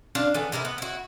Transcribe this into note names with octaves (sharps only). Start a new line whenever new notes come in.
D4 F5
E3 B3 A4
C3 E4 A#4 B4
B3
E4 F#4